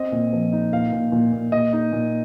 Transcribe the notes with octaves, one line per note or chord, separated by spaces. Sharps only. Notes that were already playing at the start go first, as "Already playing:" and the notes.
Already playing: C4 D#5
A#2
F3
D#4
A#2 F5
A#2
A#2
A#2
A#2 D#5
D#4
A#2